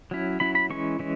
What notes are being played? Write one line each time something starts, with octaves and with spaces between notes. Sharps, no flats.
F#3 C#4 E4
F#3 C#4 E4 B5
B5
E3 G#3 C#4 E4 C#6
E3 G#3 C#4